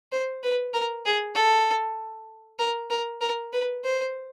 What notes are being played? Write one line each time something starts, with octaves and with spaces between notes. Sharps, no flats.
C5
B4
A#4
G#4
A4
A#4
A#4
A#4
B4
C5